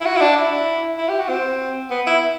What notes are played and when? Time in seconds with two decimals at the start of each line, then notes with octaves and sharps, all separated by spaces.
0.01 E4
0.05 F#4
0.16 E4
0.21 D4
0.37 E4
0.98 E4
1.08 G4
1.19 F#4
1.29 C4
1.90 B3
2.07 E4